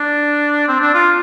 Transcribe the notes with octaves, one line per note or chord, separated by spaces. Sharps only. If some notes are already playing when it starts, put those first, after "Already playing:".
Already playing: D4
C4
D4
F4